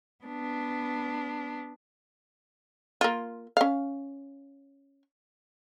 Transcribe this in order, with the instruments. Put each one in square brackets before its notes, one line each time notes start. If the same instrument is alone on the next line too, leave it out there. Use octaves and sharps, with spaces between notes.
[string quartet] B3 D4
[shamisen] A#3 F4
C#4 F5